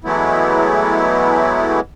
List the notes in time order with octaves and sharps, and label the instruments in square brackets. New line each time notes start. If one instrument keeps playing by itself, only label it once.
[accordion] E3 F#3 G#3 A3 B3 E4